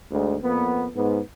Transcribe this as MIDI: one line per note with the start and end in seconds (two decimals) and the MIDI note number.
0.12 0.36 38
0.12 0.36 44
0.42 0.87 41
0.42 0.87 58
0.42 0.87 59
0.96 1.19 44
0.96 1.19 59